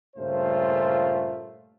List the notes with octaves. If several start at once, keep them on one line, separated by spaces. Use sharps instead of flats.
G2 A#2 C#3 A3 F4 C5